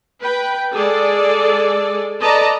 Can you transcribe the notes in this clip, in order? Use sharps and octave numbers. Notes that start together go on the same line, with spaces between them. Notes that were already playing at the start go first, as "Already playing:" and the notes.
B4 G5
G#3 G#4 A4 D5
A4 B4 D5 D#5 A5 A#5